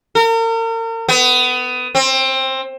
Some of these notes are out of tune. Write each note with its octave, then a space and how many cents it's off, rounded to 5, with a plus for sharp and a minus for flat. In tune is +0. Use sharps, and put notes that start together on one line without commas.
A#4 -40
B3 +25
C4 +20